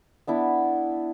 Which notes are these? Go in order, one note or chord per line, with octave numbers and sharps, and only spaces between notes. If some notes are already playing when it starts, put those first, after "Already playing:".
B3 D4 E4